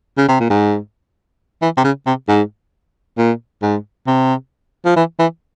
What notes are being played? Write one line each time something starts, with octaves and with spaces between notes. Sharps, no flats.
C#3
C3
A#2
G#2
E3
C3
C#3
C3
G#2
A#2
G#2
C3
F3
E3
E3